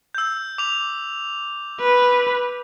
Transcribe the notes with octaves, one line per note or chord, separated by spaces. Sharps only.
E6 G6
D6 F7
B4